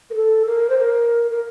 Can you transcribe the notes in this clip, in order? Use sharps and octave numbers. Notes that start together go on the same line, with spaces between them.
A#4
A4
A#4
C5
A#4
A#4